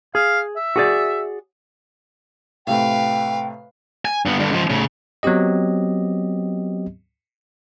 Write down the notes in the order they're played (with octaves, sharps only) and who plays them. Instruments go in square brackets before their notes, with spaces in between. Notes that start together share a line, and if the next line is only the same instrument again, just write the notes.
[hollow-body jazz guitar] G#4 [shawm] F5
[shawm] E5
[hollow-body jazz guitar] F#4 G#4 D5
[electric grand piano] A2 C3 A3 [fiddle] B4 F5 [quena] G5
[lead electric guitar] G#5
G2 B3
G2 D3
C#2 F3
A2 C#3
[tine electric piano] F#3 B3 C4 G4 D#5